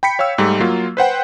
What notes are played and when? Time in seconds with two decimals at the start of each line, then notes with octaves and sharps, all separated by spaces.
0.03 G5 B5 B6 C#7
0.19 C#5 F5 G5 E6
0.38 G#2 G3 A3
0.60 F#3 A#3 F4
0.97 B4 C5 F#5 G5